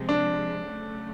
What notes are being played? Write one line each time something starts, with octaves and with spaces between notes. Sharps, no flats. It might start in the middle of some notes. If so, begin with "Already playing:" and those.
Already playing: C3 F3 G#3 C4
D4
C#3 F#3 A3